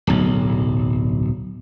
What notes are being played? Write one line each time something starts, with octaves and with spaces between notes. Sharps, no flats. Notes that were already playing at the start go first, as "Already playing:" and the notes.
D1 B1